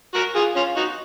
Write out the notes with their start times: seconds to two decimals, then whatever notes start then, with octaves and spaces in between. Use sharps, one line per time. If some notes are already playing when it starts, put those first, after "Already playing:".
0.14 F#4 A#4
0.35 F4 G#4
0.56 C#4 F4
0.76 D#4 F#4